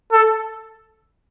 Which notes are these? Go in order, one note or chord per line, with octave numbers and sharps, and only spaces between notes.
A4